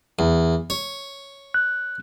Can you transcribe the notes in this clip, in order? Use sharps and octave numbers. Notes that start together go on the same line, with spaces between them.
E2
C#5
F#6